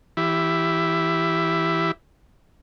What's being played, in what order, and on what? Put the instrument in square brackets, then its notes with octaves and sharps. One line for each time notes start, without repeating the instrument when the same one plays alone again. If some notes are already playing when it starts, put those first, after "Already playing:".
[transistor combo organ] E3 E4 G4 E5